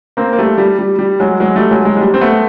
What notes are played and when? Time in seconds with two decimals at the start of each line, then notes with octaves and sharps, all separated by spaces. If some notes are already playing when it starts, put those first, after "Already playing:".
0.17 A#3 C4
0.33 A#3
0.39 G3 A3
0.58 G3
0.79 G3
0.99 G3
1.20 F#3 G#3
1.40 F#3 G#3
1.56 G3 A3
1.71 F#3 G#3
1.85 F#3 G#3
1.97 G#3
2.01 G3
2.14 C4
2.21 A3 B3